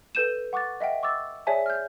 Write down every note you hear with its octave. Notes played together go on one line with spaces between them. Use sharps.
A4 B4 G6 D#7 E7
F#5 C#6 D6 F#6 A6
D#5 E5 F#5 G5
C#6 D6 E6 A6
G#4 C#5 D5 E5 G#5 A5
F6 G6